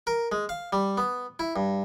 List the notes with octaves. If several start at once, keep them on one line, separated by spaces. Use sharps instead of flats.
A#4
G#3
F5
G3
B3
E4
G2